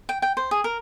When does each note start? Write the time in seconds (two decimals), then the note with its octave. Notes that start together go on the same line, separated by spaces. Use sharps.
0.09 G5
0.22 G5
0.37 C5
0.51 G#4
0.64 A#4